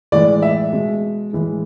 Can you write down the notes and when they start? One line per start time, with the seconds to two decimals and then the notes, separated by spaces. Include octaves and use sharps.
0.12 A2 E3 G#3 D5
0.42 E5
0.73 B2 G#3
1.33 A2 E3 G#3